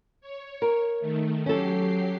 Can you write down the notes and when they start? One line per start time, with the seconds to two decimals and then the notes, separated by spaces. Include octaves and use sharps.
0.21 C#5
0.62 A#4
1.00 D#3 A3
1.46 F#3 C#4 G4 A4 C7